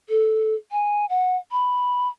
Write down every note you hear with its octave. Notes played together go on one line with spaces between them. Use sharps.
A4
G#5
F#5
B5